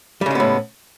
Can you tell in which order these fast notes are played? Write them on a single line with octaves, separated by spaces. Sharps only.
G3 C#3 G#3 B3 A2